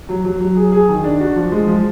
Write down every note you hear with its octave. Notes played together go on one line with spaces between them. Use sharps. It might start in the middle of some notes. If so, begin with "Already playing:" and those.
F#3
F#3
F#3
G#4
G#4
D#3
D4
F#4
F3
G#3
F3